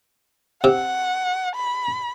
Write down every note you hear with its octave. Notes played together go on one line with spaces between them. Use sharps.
C3 F#5
B5